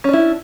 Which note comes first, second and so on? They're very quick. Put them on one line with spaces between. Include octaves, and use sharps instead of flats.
C#4 D4 E4